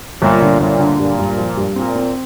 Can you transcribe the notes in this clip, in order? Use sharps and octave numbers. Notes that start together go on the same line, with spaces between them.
G1 A#2
D3
G1 A#2
D3
G2 A#2
G2
F3
G2
A#2 C4
C4